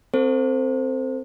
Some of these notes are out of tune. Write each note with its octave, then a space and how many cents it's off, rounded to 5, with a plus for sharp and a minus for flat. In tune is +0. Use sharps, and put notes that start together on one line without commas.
C4 +0 A4 +35 C5 +0